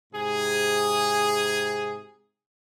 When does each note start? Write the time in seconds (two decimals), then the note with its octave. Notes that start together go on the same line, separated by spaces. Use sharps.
0.12 G#2 C3 G#4